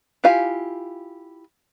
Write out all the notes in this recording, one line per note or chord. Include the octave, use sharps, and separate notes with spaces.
E4 F4 G4 F5 G#5